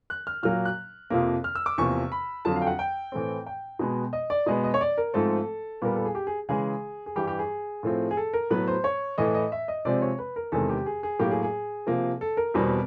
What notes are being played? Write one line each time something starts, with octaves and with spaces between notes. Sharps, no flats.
F#6
F6
A#2 F#3 A#3 F6
F#6
F2 C3 F3 A#3
F6
E6
D6
E2 C3 F3 A#3 C#6
B5
F2 D3 F#3 A5
F5
G5
F#5
G5
A2 E3 A3 C4
G5
B2 G#3 B3
D#5
D5
B2 G#3 B3 D#5
D#5
C#5
D5
A#4
G#2 F3 A3 C4 A4
A#2 G3 B3 A#4
A4
G#4
G4
G#4
C#3 E3 G#3 G#4
G#4
G2 E3 G3 G4
G4
G#4
A2 F3 A3 C4
G#4
A4
A#4
A2 F#3 B3 B4
C5
C#5
A2 E3 A3 D#5
D#5
E5
D#5
C3 F3 G#3 C4 D5
C#5
B4
A#4
E2 C3 D#3 G#3 A4
G4
G#4
G#4
A2 F#3 A#3 G4
G#4
G#4
C3 F3 A#3
A4
A#4
E2 B2 G3 C4